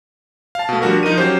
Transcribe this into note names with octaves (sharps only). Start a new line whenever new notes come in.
F5 A5
B2 A3
F3 G3 D4 F#4 A#4
F3 D#4 A#4 D#7
F#3 C#4 G4 C5